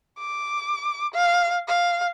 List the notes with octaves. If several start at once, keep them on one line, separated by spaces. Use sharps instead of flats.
D6
F5
F5